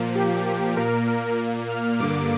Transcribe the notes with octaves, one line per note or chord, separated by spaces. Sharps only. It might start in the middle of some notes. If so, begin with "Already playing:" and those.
Already playing: A#2 F3 A#3
G4
G4
A#2 A#3 A#4
A#4
F6
G2 D3 A#3 D6